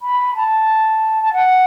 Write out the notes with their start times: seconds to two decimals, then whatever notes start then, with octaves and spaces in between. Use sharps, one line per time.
0.02 B5
0.35 A5
1.22 A5
1.33 F#5